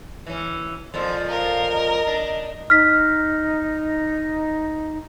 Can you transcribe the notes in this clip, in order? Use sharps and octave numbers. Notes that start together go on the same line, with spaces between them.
E3 C#4
F2 A#2 F3 C6
A#4 F5
D#5
D4
D#4 F6 B6